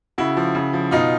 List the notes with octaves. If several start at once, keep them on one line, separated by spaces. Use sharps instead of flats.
C#3 E4 F#4
F3
C#3
F3
B2 D#4 F4